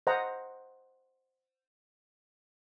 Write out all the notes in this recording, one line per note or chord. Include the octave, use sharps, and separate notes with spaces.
C5 D#5 F#5 A#5